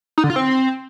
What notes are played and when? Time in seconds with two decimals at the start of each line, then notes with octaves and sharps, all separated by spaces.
0.18 D#4
0.24 D3
0.30 F4
0.36 C4